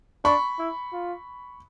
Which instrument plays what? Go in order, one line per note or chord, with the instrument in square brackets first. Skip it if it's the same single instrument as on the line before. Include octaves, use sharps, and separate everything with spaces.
[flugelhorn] D4 [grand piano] B5 C#6
[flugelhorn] E4
F4